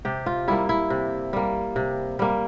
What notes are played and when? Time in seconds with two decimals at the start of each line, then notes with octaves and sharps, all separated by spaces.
0.05 C3 G4
0.26 F4
0.48 G3 A#3 E4
0.69 E4
0.90 C3
1.33 G3 A#3
1.76 C3
2.19 G3 A#3